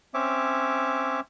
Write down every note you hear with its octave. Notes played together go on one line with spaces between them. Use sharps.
C4 C#4 C#5 E5 D6